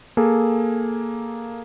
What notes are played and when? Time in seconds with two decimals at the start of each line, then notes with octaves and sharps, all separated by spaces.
0.17 A#3 G#4 A4